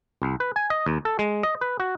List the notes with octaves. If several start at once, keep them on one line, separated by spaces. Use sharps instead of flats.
C2
B4
G#5
D#5
D#2
A4
G#3
D#5
B4
F#4